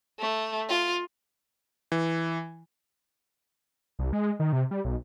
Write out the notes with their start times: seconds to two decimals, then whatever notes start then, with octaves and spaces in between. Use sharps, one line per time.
0.19 A3
0.69 F4
1.92 E3
3.99 C2
4.13 G#3
4.40 D#3
4.53 C3
4.71 G3
4.85 B1